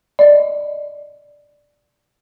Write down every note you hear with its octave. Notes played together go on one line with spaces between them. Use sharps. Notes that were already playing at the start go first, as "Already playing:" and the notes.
D5 D#5